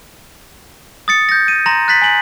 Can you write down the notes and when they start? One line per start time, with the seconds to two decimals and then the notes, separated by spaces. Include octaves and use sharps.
1.08 D#6 A6 C#7
1.29 G6 A#6
1.48 D#7
1.66 A#5 C6 A#6
1.88 F#6 A6 B6 F#7
2.02 G#5 F#7